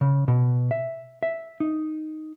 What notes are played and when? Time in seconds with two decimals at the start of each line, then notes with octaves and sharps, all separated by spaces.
0.01 C#3
0.28 B2
0.71 E5
1.23 E5
1.60 D#4